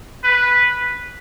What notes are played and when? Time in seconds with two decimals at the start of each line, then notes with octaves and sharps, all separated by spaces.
0.24 B4